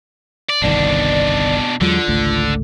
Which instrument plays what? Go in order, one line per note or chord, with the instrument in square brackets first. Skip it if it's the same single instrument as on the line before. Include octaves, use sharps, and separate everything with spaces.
[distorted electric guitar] D5
[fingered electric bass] G1 C2 D#3 [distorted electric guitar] B2 D4 [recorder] D5
[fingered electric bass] E2 F#3 G#3 [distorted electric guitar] D3 [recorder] F4
[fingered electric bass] G#1 C#2 A3